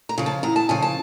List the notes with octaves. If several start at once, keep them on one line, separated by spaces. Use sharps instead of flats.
A#5
C#3 F3
A5
E2 A#5
A5
C#3 F3 G#5
A5